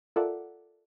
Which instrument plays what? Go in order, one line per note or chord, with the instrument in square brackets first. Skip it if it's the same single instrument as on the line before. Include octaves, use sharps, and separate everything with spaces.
[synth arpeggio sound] F4 A4 A#4 D5 E5 F#5